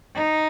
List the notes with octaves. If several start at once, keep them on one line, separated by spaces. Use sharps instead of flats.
D#4